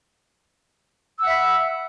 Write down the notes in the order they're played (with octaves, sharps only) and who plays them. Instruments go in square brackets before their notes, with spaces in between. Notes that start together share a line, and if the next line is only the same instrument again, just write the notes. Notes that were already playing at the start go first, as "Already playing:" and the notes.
[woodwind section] E6
F#5
E5
B5